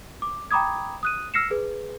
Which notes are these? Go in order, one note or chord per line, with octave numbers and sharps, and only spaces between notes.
D6
G5 A#5 B5 D6 D#6 G#6
D#6 F#6 D#7
E6 F6 A#6 C7 C#7 E7
G#4 B4